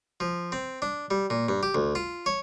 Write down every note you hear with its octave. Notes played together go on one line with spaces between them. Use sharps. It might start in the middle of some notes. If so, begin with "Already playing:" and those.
F3
C4
D4
G3
A#2
G2
G4
D2
F4
C#5